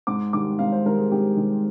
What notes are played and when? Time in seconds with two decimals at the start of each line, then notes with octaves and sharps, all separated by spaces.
0.07 G#2 D6
0.33 D#3 G3 D6
0.59 G#2 F5
0.72 C5
0.86 D#3 G3 A#4
0.98 G#4
1.12 G#2 G4
1.37 D#3 G3